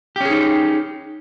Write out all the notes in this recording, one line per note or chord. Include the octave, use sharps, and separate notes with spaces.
C#4 D#4 G4 G#4